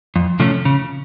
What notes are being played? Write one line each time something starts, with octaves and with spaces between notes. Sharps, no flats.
F2
C3 F3 A3 C#4
C#3